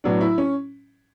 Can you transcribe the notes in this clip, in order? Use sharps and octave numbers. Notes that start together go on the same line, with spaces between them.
A2 F#3 B3 D4
E4
C#4